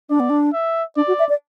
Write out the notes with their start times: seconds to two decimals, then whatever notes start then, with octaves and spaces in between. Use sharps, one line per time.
0.10 D4 D5
0.20 B3
0.30 D4
0.53 E5
0.96 D4 D5
1.08 F#4
1.19 E5
1.29 D5